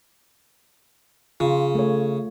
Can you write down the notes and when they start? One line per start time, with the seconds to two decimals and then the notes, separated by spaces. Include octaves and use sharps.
1.40 C#3 F4
1.75 A3 C#5